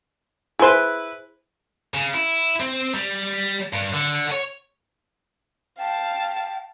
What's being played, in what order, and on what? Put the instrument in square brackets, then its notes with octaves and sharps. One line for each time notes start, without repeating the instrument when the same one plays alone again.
[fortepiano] E4 B4 [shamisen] G#4 C5
[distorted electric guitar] C#3
E4
C4
G3
G2
D3
C#5
[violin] F5 A5 [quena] G5